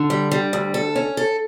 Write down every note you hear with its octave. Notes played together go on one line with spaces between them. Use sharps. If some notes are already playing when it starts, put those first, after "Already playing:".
Already playing: D3
G3
G3
D2
A4
C#4
A4